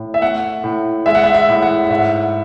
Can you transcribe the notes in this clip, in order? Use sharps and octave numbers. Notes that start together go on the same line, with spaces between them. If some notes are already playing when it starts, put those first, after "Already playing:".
Already playing: A2
E5
A3 F#5
A2
G#3 E5
F#5
E5
E5
A2
F#5
F#5
G#2 E5